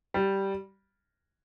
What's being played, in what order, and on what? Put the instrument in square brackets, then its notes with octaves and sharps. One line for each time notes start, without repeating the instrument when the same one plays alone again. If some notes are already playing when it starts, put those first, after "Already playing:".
[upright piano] G3